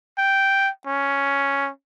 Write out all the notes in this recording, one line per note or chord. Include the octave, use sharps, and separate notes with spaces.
G5
C#4